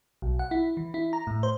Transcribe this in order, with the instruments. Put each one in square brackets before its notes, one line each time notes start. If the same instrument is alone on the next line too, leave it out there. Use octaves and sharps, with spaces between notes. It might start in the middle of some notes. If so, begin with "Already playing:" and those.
[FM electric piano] B1
F#5
E4
E3
E4
A#5
A2
C5